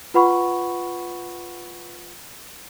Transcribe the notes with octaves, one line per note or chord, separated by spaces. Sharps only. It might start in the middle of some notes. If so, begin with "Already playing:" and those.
F4 B4 F#5 B5 C#6